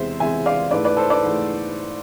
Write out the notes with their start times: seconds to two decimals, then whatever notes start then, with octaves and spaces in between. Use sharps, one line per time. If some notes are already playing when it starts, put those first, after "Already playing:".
Already playing: E2 C3 G#3 C5 E5
0.20 E2 C3 G#3 E5 G#5
0.46 D5 F5
0.71 G#2 E3 A3 B4 D5
0.84 B4 D5
0.97 A4 C5
1.10 B4 D5
1.22 G#2 E3 A3